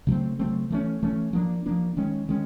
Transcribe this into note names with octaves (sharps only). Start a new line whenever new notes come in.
C#3 F#3 A3 C4
C#3 F#3 A3 C4
E3 A3 C#4
E3 A3 C#4
F3 A#3 D4
F3 A#3 D4
D#3 G#3 C#4
D#3 G#3 C#4